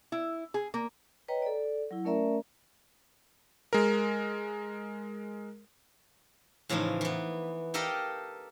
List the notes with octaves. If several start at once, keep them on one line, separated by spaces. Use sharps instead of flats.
E4
G#4
A#3
B4 C#5 D#5 G5 A#5
A4 D5
F#3 E4
A3 C#4 A#4 D5 E5 A#5
G#3 A#4
A2 C#3 E3 F3 D#4
E3 B3
G4 A4 A#4 D#5 F5 G5